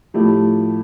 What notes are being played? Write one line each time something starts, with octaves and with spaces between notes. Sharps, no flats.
A2 F3 A3 E4 G4